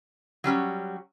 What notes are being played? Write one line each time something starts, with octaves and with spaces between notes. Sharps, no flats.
F#3 G3 C#4 F#4